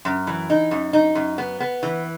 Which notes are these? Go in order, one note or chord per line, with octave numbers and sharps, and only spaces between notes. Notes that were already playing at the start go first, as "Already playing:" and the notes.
F#2
E3
D#4
F#2
D#4
F#2
B3
B3
E3